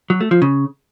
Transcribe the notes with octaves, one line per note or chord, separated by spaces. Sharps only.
F#3
A3
F3
C#3